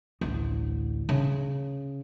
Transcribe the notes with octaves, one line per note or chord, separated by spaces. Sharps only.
A1 D2
C#3